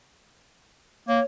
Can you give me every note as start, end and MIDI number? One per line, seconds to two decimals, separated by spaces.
1.08 1.20 58
1.08 1.24 73